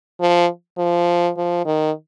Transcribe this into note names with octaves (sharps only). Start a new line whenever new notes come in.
F3
F3
F3
D#3